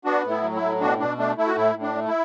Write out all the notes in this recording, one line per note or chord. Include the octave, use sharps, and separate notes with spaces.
B3 D4 F#4
A2
E4
F#3
E4
A2
B2 D4 F#4
B2 D4
A3 D4
A3 E4
F#4
A2 E4
A2
D4
A3
E4